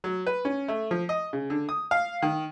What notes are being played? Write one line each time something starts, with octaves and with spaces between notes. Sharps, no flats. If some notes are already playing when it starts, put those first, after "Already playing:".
F#3
B4
C#4
A3
F3
D#5
C#3
D3
D#6
F5
D#3